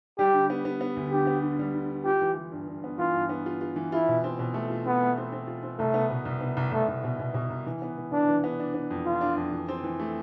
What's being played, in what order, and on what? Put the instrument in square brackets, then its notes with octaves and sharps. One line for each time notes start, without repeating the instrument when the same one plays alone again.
[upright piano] G3 [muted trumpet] G4
[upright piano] D3
B3
B3
B3
D2
[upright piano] D3 [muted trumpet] G4
[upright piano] B3
D3
G3
D3
D3
[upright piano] F4 [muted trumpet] G4
[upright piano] E3
E3
G2
G2
B3
[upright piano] E3 [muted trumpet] F4
[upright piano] G2
B3
F4
F4
E3
[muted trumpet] E4 [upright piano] F4
[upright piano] B2
C4
B2
A3
F4
[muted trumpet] B3 [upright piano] F4
[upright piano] A3
C4
C4
F4
C4
[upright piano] C2 [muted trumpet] A3
[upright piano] B3
B2
C2
B3
C2
[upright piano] C2 [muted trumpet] A3
[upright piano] C2
B2
B2
B2
C2
E3
B3
E3
[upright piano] E3 [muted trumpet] D4
[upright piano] E3
B3
D4
B3
F2
[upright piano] D4 [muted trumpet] F4
[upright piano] D4
F2
E3
C4
E3
A3